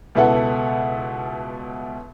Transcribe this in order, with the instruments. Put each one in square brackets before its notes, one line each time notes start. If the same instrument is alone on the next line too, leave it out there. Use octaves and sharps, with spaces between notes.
[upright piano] C#2 B2 B3 E4 A4 F#5